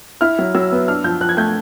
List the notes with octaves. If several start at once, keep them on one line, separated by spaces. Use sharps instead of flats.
E4 F6
F#3
F#3 E6
B3
D4 F6
F3 G6
F3 F#6
G#6
A3 G6